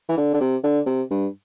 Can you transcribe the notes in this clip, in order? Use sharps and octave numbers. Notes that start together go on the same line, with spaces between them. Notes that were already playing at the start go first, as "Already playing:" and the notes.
E3
D3
D3
C3
D3
C3
G2